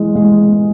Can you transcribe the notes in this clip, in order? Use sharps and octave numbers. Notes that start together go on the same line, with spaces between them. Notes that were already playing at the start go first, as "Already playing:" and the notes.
Already playing: E3 G#3
G#3